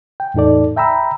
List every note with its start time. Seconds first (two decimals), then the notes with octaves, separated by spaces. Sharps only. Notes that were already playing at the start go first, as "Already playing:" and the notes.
0.20 G5
0.34 E2 A2 D#4 A4 D5
0.77 E5 G5 A#5 B5 E6